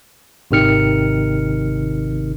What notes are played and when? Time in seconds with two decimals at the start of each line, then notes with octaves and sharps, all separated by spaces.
0.51 G#1 C3 D#3 F6 C#7